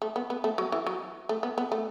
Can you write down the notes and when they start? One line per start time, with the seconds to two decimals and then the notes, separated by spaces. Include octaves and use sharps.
0.02 A3
0.16 B3
0.30 B3
0.44 A3
0.58 F#3
0.72 E3
0.87 F#3
1.29 A3
1.43 B3
1.58 B3
1.72 A3